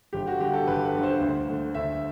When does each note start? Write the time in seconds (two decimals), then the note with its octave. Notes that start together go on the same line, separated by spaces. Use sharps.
0.13 G1 G4
0.27 F#4
0.40 G2 D3 G4
0.53 A4
0.67 G1 B4
0.85 B4
0.95 G2 D3
1.03 C5
1.21 D2
1.49 D3 A3
1.75 D2 E5